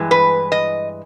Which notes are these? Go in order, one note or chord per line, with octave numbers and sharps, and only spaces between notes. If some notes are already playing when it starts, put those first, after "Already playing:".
Already playing: G2 E3 G#3
B4
D#5